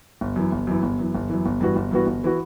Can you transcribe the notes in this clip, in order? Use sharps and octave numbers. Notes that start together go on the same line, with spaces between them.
G1
F#2 E3
G1
F#2 E3
G1
F#2 E3
G1
F#2 E3
G1
G2 E3 B3 F#4
G1
G2 E3 B3 F#4
G1
E3 B3 F#4